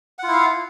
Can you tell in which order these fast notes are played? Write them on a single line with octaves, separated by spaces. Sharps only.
F#5 F4 E4 F5